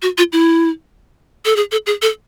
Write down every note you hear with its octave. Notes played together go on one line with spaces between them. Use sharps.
F#4
F4
E4
A4
G#4
A4
G#4
A4